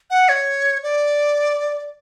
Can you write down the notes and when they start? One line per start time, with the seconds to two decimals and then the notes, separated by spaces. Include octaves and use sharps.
0.10 F#5
0.29 C#5
0.83 D5